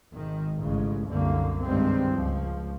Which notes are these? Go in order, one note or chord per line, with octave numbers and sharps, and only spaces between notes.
G#1 D#3
A1 G#2 C#3
C2 F#2 D3 A#3
G2 C3 D#3 G3 G#3 C4
C#2 F3